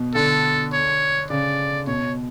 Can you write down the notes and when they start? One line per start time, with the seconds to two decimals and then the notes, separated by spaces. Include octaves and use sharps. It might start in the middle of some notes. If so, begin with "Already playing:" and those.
Already playing: B2
0.15 D3 A4
0.73 C#5
1.30 C#3 D5
1.87 B2 C#5